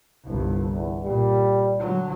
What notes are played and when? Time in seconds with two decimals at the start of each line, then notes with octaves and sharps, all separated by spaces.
0.25 G1 C2
0.72 E2
1.04 A#2 G3
1.79 D3 F#3